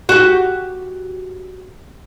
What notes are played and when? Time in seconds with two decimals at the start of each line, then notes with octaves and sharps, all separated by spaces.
0.09 F#4 G4